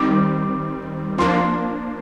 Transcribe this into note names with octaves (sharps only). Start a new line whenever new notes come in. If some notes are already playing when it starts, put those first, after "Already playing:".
Already playing: D#3 G3 C4 D6
F3 A#3 D4 C6